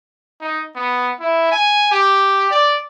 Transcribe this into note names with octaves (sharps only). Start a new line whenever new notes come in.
D#4
B3
E4
G#5
G4
D5